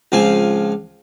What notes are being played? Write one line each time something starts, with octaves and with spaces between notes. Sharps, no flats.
C#2 F3 C4 F5 G#5